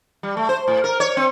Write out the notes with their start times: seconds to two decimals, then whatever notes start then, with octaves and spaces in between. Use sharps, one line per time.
0.23 G3
0.37 A3
0.49 C5
0.68 A2
0.84 A#4
1.00 C#5
1.17 C4